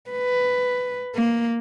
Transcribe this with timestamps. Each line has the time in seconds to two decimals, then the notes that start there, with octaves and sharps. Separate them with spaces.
0.11 B4
1.15 A#3